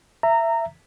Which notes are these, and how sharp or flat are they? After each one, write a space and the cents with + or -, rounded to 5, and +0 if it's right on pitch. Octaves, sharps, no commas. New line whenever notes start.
E5 +15 A#5 -20